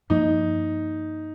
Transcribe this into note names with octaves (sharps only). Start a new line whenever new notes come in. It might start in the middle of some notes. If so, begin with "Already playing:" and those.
G2 F3 A#3 D#4